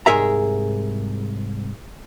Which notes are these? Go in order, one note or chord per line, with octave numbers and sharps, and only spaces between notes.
C2 G#2 G#4 A#4 E5 A#5